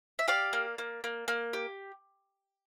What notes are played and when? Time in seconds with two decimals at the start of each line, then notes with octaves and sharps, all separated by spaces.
0.19 E5
0.28 G4 D5 F5
0.53 A#3
0.78 A#3
1.04 A#3
1.28 A#3
1.53 G4